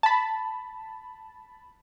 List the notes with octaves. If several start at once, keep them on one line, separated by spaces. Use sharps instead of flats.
A5 B5